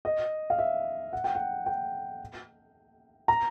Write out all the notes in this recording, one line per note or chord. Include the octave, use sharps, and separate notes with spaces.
D#5
F5
E5
F#5
G5
F#5
G5
A#5